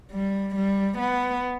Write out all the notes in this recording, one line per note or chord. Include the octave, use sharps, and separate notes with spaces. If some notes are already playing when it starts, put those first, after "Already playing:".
G3
G3
B3